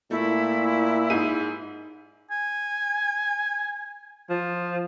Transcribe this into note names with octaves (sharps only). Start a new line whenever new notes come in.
A#2 A3 E4
G#2 G#4 D#7
G#5
F3